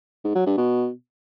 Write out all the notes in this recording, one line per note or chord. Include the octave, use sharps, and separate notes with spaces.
G#2
F#3
G2
B2